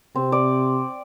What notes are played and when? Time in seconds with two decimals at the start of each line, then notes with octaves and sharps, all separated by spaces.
0.15 C3 C4
0.32 D5